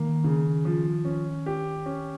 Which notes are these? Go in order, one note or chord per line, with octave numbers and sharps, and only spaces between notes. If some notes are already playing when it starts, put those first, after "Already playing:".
Already playing: D#3 A#3
C#3
F3
C#4
G4
C#4